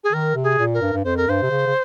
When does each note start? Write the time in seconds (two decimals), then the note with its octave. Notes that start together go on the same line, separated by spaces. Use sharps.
0.04 G#4
0.13 D#3 A#4
0.35 C3
0.43 G#4
0.58 A#2
0.74 A#4
0.82 G2
0.93 G2
1.04 F2 C5
1.17 A#4
1.27 G2 C5
1.42 C3
1.51 C#3
1.66 C#3